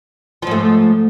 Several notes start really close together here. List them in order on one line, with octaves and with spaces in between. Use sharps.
F3 G#2 A3